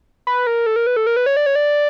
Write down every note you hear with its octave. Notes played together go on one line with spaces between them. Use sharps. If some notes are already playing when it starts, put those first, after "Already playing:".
B4
A#4
A4
A#4
B4
A4
A#4
B4
C#5
D5
C#5
D5